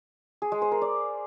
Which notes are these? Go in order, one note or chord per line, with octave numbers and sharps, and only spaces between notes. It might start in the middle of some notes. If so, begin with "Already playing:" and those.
G#4
G#3
C5
A#4
D5